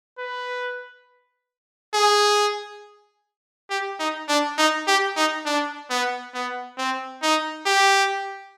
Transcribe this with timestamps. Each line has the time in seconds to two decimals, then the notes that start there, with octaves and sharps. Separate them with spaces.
0.19 B4
1.94 G#4
3.70 G4
4.00 D#4
4.29 D4
4.58 D#4
4.88 G4
5.17 D#4
5.46 D4
5.90 B3
6.34 B3
6.78 C4
7.22 D#4
7.66 G4